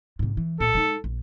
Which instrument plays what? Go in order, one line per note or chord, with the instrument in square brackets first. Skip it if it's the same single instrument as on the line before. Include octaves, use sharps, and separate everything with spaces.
[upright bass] G#2 C3
E3
[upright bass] C2 A#2 [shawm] A4
[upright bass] G#3 D#4
A#1